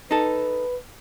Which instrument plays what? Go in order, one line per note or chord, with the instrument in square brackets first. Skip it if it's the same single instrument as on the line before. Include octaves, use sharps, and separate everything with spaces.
[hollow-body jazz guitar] D#4 A4 [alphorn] B4